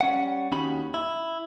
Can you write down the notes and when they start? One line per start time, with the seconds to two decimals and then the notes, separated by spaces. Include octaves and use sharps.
0.01 G3 C#4 F#5
0.52 D#2 C#4 D#4 F#4 G4 B5
0.94 E4